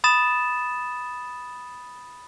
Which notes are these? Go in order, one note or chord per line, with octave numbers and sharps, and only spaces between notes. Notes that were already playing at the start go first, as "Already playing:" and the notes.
B5 D#6 A6 E7